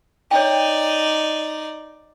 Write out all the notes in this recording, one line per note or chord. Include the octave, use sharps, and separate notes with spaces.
D#4 C#5 D5 G5